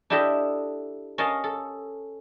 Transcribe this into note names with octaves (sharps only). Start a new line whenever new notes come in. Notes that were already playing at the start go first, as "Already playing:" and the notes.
D4 E4 G4 A4 D#5 E5
C#4 A#4 D#5 F5 A5
A4